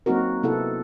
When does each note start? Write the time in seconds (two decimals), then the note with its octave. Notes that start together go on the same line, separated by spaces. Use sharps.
0.06 F#3 A#3 C4 D#4 F#4 A#4
0.43 C3 B3 E4 A4 F#5